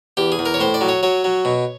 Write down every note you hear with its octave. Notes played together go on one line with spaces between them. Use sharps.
E2 G4
G#4
E2
A#4
C#5
A2 C5
D5
F#3
C#5
F#3 C#5
F#3
B2